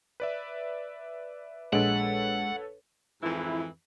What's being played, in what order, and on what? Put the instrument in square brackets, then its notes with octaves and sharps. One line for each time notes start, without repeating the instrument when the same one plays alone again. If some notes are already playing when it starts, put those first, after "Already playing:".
[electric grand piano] B4 D5 E5
[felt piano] A#1 D7 [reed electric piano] G#3 [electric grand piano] A4 B4 C#5 [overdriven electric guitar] F#5
[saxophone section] F2 G#2 E3 [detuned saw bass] E4